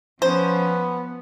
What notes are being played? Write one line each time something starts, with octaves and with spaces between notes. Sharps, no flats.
F3 B3 C#4 C5